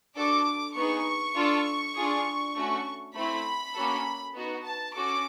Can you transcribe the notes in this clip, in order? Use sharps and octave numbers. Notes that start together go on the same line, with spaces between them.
D4 F#4 A4 D6
B3 D#4 G#4 C#6
D4 F4 A4
D4 F4 G#4
A3 C#4 F#4
A3 C4 E4 B5
A#3 C#4 F#4 A4
B3 D#4 F#4
A5
C#4 F#4 A4 D6